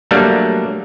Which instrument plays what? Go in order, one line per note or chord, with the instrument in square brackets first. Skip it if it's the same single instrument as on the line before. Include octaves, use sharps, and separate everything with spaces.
[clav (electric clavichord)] F#3 G3 A3 A#3 D4